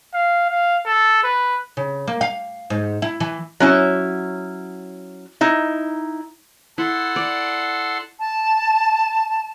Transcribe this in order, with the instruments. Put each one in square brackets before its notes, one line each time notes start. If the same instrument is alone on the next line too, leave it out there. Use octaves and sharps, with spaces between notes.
[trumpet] F5
F5
A4
B4
[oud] C#3
A#3
F5
G#2
E4
E3
[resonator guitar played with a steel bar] F#3 C#4 E4
D#4 E4
[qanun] E4 [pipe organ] A4 F#5 C6
[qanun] D5
[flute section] A5